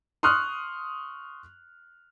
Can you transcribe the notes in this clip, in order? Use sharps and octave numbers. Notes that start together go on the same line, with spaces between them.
C6 C#6 D#6 F6 F#6